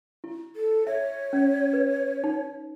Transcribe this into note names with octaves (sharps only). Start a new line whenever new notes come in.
E4
A4
C#5 E5
C#4
B4
D#4